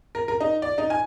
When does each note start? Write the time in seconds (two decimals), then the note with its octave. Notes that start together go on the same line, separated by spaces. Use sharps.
0.15 A#4
0.28 A#4
0.40 D#4
0.62 D5
0.78 D#4
0.90 G#5